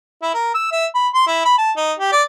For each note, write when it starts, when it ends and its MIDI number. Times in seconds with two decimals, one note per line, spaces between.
0.22 0.30 64
0.34 0.52 70
0.54 0.70 88
0.71 0.86 76
0.94 1.08 83
1.14 1.22 84
1.27 1.45 64
1.45 1.55 83
1.58 1.71 81
1.76 1.93 63
1.99 2.12 67
2.12 2.22 74